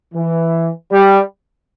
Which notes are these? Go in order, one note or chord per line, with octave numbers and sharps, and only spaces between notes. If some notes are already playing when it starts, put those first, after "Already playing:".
E3
G3